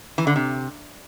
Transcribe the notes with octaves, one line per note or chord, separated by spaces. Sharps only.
E3
D3
C3